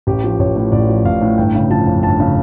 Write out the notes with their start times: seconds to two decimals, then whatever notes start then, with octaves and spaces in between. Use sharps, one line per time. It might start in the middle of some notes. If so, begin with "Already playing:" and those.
0.07 A1 G4
0.24 F3
0.39 A1 C#5
0.56 A2
0.72 A1 D5
0.89 F3
1.05 A1 F5
1.21 A2
1.38 G1 G5
1.55 C#3
1.70 F3 A5
1.86 F2
2.03 G1 A5
2.20 C#3